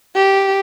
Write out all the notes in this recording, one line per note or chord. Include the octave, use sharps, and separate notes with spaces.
G4